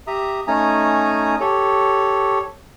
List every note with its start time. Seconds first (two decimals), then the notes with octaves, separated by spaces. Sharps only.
0.07 G4 E5 A#5 D#6
0.47 A3 C#4 D#4 G#5 A#5 D#6
1.40 G4 A4 C#5